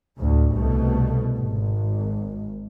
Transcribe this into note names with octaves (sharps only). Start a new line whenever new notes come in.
D2 A2
C2 B2 A3
G#1